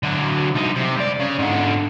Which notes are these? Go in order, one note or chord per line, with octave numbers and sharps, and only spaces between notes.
D3 F#3
C2 D#4
C3
G2 D5
C#3
G#2 D3